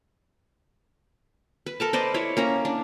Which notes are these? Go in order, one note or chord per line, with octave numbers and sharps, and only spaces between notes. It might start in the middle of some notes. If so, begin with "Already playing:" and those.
B4
A4 A#4 A5
B4 C5 D5 D#5
E4 C#5 D5
A#3 C#4 A#5
D4